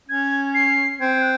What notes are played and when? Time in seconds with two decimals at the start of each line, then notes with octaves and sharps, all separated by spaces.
0.08 C#4 G#6
0.54 C7
1.00 C4 G#6
1.22 F#6